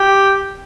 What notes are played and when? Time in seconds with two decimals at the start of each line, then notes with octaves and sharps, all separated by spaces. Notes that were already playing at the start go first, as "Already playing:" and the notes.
Already playing: G4